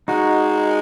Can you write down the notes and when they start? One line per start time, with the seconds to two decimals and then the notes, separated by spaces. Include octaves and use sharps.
0.08 G#3 D#4 F#4